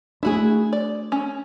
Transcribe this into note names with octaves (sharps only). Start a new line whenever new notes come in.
A3 D4 E4 F#4 G#4
D5
C#4